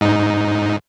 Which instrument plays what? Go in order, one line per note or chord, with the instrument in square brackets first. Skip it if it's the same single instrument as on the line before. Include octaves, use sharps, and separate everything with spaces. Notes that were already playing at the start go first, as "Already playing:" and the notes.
[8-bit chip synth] G#2 D#4